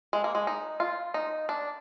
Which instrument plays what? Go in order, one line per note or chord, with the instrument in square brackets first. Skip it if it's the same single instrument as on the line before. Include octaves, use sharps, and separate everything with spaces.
[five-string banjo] G#3
A#3
G#3
D#4
F4
D#4
D4